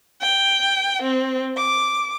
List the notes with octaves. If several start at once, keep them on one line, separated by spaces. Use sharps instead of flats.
G5
C4
D6